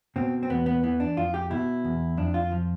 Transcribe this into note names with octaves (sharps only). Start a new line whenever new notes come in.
B2 C4
C4
E2 B3
B3
E3 B3
D4
F2 F4
G4
B2 E4
E2
F2 D4
F4
F3